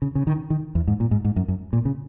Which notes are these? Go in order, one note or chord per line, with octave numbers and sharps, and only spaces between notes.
C#3
C#3
D#3
D#3
E2
G#2
A#2
G#2
G#2
F#2
F#2
A#2
C#3